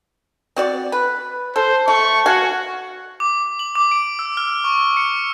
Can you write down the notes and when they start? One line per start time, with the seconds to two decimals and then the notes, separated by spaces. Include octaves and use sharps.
0.56 C4 F#4 D5
0.92 B4
1.56 A4 C5
1.88 A3 C#6
2.26 F#4 F5 F#5 G#5
3.20 D6
3.59 F#7
3.75 D6
3.91 D7
4.19 E6
4.37 F6
4.64 C#6
4.97 C#7